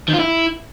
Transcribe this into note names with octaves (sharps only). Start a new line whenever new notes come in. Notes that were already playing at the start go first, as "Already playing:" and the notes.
D#3
F4
E4